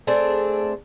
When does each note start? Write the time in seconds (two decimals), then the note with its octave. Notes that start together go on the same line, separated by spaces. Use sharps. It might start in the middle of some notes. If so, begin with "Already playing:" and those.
0.07 A3 C4 D4 G#4